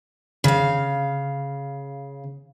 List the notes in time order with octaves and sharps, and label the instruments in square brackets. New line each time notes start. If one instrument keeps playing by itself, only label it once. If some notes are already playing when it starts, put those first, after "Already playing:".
[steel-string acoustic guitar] C#3 F5